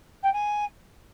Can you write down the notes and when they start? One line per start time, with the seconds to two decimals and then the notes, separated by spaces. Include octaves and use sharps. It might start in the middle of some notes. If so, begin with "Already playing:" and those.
0.23 G5
0.33 G#5